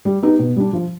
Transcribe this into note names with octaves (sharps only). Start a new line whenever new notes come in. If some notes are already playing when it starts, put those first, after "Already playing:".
G3
B3 D#4 G4
B2
G3 D4
F3